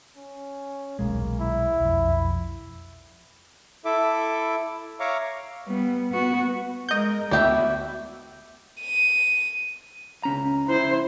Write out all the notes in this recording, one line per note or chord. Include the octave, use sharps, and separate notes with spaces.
C#4
D#1 B1 G#3 A#3
E4
B1 F2
E4 A4 E5 D6
C#5 E5 F5 A#5 C#6 D6
G3 B3
B3 F#4
G#3 A#4 D#5 G6
D2 B3 E4 F#4 G4 E5
D#7
C#2 C#4 A#5
E4 C5